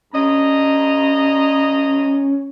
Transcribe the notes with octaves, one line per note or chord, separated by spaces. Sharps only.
G2 C#4 D#5 A#5